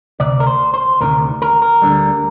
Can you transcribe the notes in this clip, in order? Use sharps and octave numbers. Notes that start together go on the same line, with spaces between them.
D2 C3 D5
A#4
C5
C5
D2 C3 D#3 A#4
A#4
A#4
D2 D3 G3